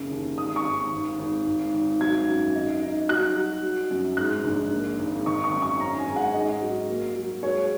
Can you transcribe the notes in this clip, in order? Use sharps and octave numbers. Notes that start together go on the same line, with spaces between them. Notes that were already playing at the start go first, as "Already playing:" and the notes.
Already playing: F#1 C#3
D#2
G#1 D#6
C#6
G#1
G#1
G#1
G#1
G#1
F#3 G#6
F#2
D#4
D#4
F#3 F#6
F#3
F#3
F#2
G#2 F#6
A#1
A#3
G#1
D#3 C#6
C#6
F#2
C#6
C#4 A#5
G#5
G#2
F#5
G#2 D#5
F#3
A#3
F#3
G#3 C#5